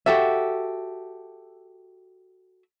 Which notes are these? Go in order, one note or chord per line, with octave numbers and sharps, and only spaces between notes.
F#4 G4 A4 E5